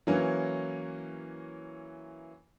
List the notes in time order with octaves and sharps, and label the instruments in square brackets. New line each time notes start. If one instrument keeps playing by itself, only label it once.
[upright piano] E3 F#3 A#3 C#4